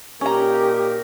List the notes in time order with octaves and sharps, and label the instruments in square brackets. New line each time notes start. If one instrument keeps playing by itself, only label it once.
[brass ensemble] A#2 D#4 A#4 [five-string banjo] C#4 A#5 [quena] G4